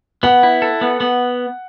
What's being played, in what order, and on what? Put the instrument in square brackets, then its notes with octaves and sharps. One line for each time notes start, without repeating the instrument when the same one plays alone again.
[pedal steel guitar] B3 [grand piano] F#5
[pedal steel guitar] E4
A4
B3
B3